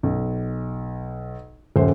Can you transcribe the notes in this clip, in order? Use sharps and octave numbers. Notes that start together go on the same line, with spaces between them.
B1
D#1 F#2 C5